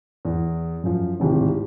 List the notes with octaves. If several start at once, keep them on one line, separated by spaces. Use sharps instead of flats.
E2
F#2 F3
D1 G#1 C3 G4